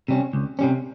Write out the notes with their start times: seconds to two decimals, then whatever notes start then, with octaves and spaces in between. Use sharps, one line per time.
0.08 C3 G3 C#4
0.33 C#2
0.59 C3 G3 C#4